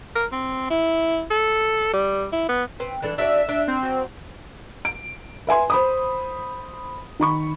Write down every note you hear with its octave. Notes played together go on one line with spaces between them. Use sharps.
A#4
C4
E4
A4
G3
E4
B3
C4 B4
E3 D4 A4
D4 F#4 D5 E5
D4
C4
F#3
D7
B4 E5 G#5 C6
C5 B5 D#6
D#3 B5 C#6